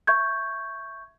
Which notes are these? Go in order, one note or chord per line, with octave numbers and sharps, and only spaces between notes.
E5 C#6 G6 G#6